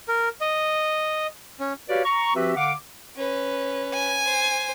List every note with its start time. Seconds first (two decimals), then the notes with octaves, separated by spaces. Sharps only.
0.08 A#4
0.41 D#5
1.60 C#4
1.89 F#4 G4 B4 C#5 D5 F5
2.04 A#5 C#6
2.35 F3 C4 F#4 G4 B4 E5
2.55 D3 F5 F#5 D6
3.16 C#4 B4
3.94 G#5
4.25 C5